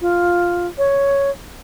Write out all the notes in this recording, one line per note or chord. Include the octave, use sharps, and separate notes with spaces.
F4
C#5